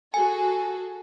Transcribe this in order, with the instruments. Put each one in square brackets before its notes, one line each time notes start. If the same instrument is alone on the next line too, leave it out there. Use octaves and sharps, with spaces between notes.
[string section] F#4 G#4 A4 [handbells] G#5